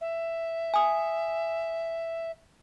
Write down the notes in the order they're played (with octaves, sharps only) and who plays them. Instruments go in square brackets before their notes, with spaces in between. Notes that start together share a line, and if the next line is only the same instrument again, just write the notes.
[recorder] E5
[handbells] G#5 D#6